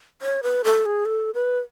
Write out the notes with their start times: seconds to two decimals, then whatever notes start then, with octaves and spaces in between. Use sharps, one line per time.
0.22 C#5
0.43 B4
0.64 A4
0.86 G#4
1.05 A4
1.35 B4